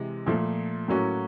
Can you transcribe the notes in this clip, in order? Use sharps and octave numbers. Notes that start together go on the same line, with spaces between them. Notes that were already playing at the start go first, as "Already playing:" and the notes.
Already playing: C3 E3 G#3
A#2 F3 A3
A2 F#3 A#3 C#4 F#4